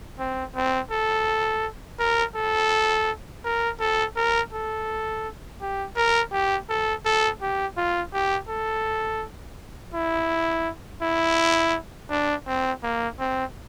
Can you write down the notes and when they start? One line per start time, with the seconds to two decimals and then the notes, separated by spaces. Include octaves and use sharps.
0.19 C4
0.56 C4
0.91 A4
1.99 A#4
2.36 A4
3.45 A#4
3.80 A4
4.16 A#4
4.53 A4
5.61 G4
5.96 A#4
6.32 G4
6.69 A4
7.05 A4
7.41 G4
7.77 F4
8.13 G4
8.49 A4
9.94 E4
11.02 E4
12.10 D4
12.47 C4
12.83 A#3
13.19 C4